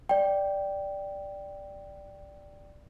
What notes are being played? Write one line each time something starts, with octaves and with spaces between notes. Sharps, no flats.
D5 G5